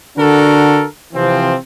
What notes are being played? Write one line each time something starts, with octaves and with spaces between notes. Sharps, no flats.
D3 D4 F#4 A4 A#4
C3 E3 F3 C4